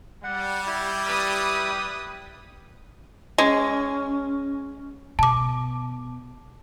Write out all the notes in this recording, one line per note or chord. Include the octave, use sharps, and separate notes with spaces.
G3 F#5
E4 G4
B4 D#6
G#3 C#4
B2 A5 D6